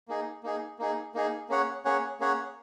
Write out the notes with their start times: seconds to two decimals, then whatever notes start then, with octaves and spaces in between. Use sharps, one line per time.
0.08 A#3 D#4 G#4
0.43 A#3 D#4 G#4
0.79 A#3 D#4 G#4
1.14 A#3 D#4 G#4
1.49 A#3 C#4 G#4 C#5 F#5
1.85 A#3 C#4 G#4 C#5 F#5
2.20 A#3 C#4 G#4 C#5 F#5